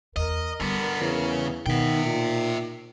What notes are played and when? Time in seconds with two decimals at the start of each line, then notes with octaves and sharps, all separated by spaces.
0.16 E2 A#4 D#5
0.60 D3 G3 B3
1.01 E2 C#3
1.66 B2 D#3 B3 E5 G5
2.05 A#2 D#4